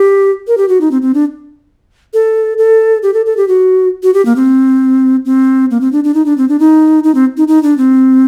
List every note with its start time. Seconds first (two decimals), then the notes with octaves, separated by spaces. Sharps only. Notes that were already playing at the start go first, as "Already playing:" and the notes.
Already playing: G4
0.48 A#4
0.57 G4
0.69 F#4
0.81 D#4
0.91 C4
1.02 C4
1.14 D4
2.14 A4
2.58 A4
3.03 G4
3.14 A4
3.26 A4
3.37 G4
3.48 F#4
4.03 F#4
4.14 G4
4.25 A#3
4.36 C4
5.25 C4
5.71 A#3
5.81 C4
5.93 D4
6.04 D4
6.14 D#4
6.26 D4
6.38 C4
6.49 D4
6.60 D#4
7.04 D#4
7.15 C4
7.37 D#4
7.48 D#4
7.63 D4
7.78 C4